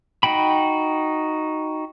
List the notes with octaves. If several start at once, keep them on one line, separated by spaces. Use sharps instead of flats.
D#4 F#4 G5 B5